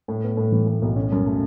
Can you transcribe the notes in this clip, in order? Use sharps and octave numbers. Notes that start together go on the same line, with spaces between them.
A2
B3
A2
E3
A2
B1
C#4
F#2
A3